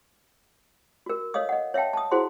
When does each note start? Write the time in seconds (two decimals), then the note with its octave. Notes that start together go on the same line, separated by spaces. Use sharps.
1.06 F#4 A#4
1.34 A4 C#5 D#5 F5 D#6
1.49 D#5 F#5
1.74 C#5 E5 F5 G5 A5
1.93 A5 D#6
2.11 E4 F#4 G#4 C5 F#5 C6